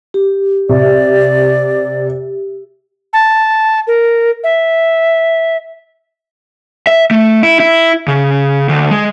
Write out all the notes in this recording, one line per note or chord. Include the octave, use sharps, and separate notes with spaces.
G4
C3 D5
A5
A#4
E5
E5
A3
E4
E4
C#3
D2
G#3